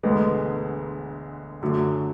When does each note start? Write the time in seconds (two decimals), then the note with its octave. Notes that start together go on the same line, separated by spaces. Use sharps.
0.03 E1 D2 D3 G#3 B3
1.62 F#2 D3 F#3 A3